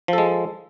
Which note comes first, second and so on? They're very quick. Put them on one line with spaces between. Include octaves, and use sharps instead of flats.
F3 A4 G#3